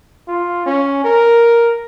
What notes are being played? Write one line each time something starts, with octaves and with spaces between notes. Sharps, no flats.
F4
C#4
A#4